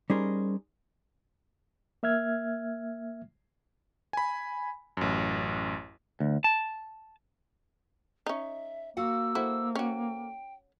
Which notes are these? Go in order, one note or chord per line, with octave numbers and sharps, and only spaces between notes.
G3 C#4 D#4 G#4 A#4 C5
A#3 E5 F6 G#6
G#5 B5
A1 F#2
D2
A5
C#4 D#4 E5
A#3 F#4 F5 F#5 E6
E4 F#4 A4 C5
C#4 F#4 G5